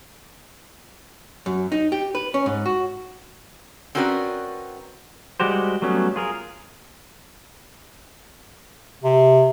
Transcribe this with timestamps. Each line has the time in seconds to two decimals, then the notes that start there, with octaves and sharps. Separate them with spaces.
1.46 F#2
1.72 D#4
1.92 G4
2.15 B4
2.34 C#4
2.46 G#2
2.66 F#4
3.95 C4 C#4 F#4 A#4 B4 D5
5.40 G3 G#3 F#4 G4 C5
5.82 F#3 G3 A3 B3 C#4
6.16 F4 G#4 A#4
9.03 C3